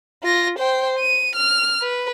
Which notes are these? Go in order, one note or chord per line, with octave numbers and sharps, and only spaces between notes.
F4 A#6
C5 G5
D#7
F6
B4